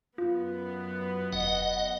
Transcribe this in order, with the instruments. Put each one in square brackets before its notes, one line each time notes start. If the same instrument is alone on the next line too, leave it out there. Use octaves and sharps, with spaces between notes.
[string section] F#2 B3 [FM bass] F4
[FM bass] E1 [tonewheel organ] D#5 F#5